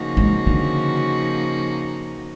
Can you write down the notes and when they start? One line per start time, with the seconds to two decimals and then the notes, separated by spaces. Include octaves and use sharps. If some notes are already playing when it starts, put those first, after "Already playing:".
Already playing: C#3 F3 A#3 D#4 F#4
0.17 G#3
0.47 D3